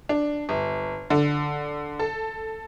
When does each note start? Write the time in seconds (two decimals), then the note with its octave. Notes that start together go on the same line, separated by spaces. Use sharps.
0.09 D4
0.49 G1
1.10 D3
1.99 A4